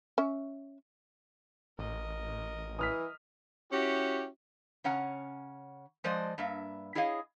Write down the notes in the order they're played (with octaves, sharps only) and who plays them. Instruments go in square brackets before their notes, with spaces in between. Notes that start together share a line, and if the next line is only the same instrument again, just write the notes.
[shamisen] C#4 E5
[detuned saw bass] A1 [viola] A#4 D#5
[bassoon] E3 [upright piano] D#6 F6 B6
[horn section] C#4 E4 F#4 G4
[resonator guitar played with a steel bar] C#3 C#4 F#5 A#5
F3 G#3 C5 D5 D#5
G2 A#3 E5
E4 G#4 C#5 D#5 F5